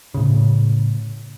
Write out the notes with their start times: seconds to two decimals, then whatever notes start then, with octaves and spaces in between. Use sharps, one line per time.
0.14 A2 C#3